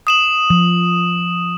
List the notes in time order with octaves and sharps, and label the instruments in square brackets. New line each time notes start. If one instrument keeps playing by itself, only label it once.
[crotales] D#6 E7 F#7
[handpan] F3